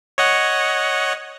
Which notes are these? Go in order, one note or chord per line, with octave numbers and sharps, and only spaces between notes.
C#5 D#5 F#5